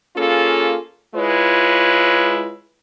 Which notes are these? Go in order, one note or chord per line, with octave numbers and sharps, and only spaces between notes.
A#3 C#4 F4 G#4 A4
G#3 E4 F4 B4 C#5